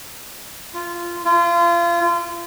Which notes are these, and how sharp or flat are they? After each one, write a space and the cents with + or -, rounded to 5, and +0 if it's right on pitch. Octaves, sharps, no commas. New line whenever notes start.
F4 -15
F4 -30